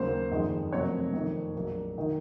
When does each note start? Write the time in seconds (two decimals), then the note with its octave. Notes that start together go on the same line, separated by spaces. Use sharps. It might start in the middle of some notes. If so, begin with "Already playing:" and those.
Already playing: D#2 C#3 F#3 A#3 C5
0.31 F#1 F2 D#3 G#3
0.72 F1 F2 C3 F#3 A#3 C#5
1.14 F2 D#3 A#3
1.56 A#1 A#2 F#3 A#3
1.98 D#3 A#3